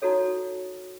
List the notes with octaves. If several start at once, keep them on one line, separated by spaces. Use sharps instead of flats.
D#4 E4 F#4 A4 C#5